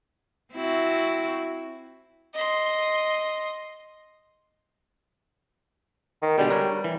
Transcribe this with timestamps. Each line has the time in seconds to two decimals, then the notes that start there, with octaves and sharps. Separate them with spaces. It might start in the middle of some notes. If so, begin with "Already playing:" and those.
0.54 C4 E4 F#4
2.34 D#5 C6
6.22 D#3
6.38 B2 D3 G3 G#3
6.50 A#4 B4 C#5
6.84 E3